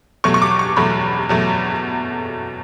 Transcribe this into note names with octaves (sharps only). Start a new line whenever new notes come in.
E2 B2 F#3 A3 C#6
C#6
D6
C#6
E2 B2 F#3 A3 B5
E2 B2 F#3 A3